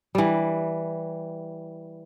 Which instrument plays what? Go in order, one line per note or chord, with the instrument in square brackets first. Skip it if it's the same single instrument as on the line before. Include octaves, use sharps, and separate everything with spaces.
[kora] E3 G3